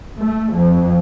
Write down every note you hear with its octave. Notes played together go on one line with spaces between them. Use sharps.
A3
F2